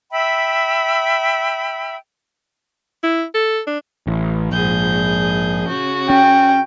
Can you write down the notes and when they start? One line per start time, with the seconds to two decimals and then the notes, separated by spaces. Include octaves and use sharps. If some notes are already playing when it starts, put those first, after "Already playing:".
0.12 E5 G5 B5 E6
3.03 E4
3.34 A4
3.67 D4
4.07 A1
4.52 A#1 G#2 G#4 G6
5.68 C#3 F#4
6.10 C#4 G5